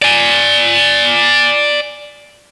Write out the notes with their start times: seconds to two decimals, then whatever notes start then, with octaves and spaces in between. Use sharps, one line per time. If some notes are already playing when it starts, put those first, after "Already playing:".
0.02 D5 G#5